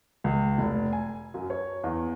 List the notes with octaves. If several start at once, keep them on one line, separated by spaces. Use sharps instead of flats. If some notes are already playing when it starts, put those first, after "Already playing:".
C#2
F1
G#5
F#2
C#5
E2